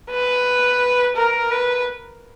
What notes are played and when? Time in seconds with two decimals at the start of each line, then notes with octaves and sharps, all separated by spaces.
0.11 B4
1.17 A#4
1.51 B4